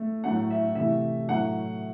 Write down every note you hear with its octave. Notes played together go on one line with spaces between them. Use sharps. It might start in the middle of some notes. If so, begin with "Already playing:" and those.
Already playing: A3
A2 F#3 A3 F#5
E5
C3 E3 A3 E5
A2 F#3 A3 F#5